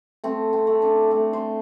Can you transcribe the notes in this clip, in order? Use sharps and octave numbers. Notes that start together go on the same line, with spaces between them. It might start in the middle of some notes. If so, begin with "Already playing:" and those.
A3 C4
C4
A3
D4
A3
C5